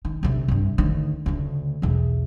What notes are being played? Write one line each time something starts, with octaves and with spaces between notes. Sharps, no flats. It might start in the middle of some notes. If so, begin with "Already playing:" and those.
D#3
D2 C3
C2 G2
D2 D#3
D2 C#3
B1 E2